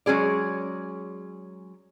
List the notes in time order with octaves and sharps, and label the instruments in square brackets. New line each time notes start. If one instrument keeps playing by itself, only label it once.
[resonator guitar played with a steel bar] F#3 G#3 C#4 G#4 D5